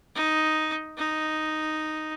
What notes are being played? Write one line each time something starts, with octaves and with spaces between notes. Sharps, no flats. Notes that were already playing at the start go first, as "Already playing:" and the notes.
D#4
D#4